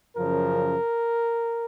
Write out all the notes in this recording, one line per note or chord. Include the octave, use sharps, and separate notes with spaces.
F#2 C#3 F3 A#4